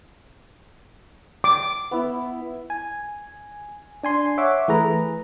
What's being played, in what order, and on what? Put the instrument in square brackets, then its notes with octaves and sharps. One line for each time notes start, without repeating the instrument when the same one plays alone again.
[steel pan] D6
[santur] B3 E4
[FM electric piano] G#5
D4 G#5 C6
C#5 E5 F#5 D6
E3 A3 G#4 B4 A#5